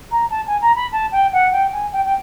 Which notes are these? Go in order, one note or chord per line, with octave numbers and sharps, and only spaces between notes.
A#5
A5
G#5
A#5
B5
A5
G5
F#5
G5
G#5
G5
G5